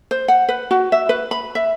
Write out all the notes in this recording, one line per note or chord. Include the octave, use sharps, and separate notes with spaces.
C5
F#5
B4
F#4
E5
B4
B5
E5